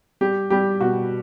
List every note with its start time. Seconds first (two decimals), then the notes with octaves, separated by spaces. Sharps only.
0.21 G3 G4
0.50 G3 G4
0.81 B2 F#4